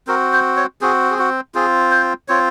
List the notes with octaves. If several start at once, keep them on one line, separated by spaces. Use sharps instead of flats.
C4 F#4 A#4
C5
C#5
C4 F#4 G#4
G#4
F#4
C4 F4 G#4
C5
C4 F4 C#5